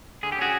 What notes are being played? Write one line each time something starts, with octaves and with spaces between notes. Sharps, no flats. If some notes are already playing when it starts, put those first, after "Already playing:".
D3 G#4
G4
C#4 F#4 G#4